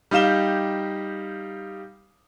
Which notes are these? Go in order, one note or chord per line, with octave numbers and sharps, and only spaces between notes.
G3 D#4 G4 F5 E7 G7